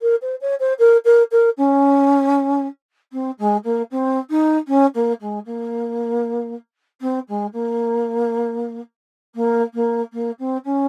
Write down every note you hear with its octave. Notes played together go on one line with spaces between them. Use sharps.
A#4
C5
C#5
C5
A#4
A#4
A#4
C#4
C4
G#3
A#3
C4
D#4
C#4
A#3
G#3
A#3
C4
G#3
A#3
A#3
A#3
A#3
C4
C#4